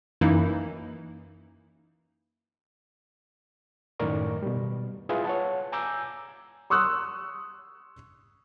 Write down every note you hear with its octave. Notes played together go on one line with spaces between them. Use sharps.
F#2 E3 A#3 D#4 E4
F#2 A2 D#3 A#4 D5 C#6
B2 G3
E4 F4 G#4 B4 E5
C#5 F#5 A5
G#5 A#5 D6 E6 G6
C6 C#6 D#6 E6 F#6